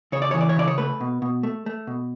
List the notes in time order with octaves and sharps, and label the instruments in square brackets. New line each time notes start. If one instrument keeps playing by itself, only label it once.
[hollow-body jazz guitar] C#3 C#5
D5
E3 C#5
D5
C#5
C#3 D5
C#5
A3 B4
B2
B2
A3
A3
B2